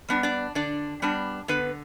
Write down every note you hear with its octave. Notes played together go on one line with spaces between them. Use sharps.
G3 B3 D4
D4 D5
D3 D4 D5
G3 B3 D4
D3 B3 B4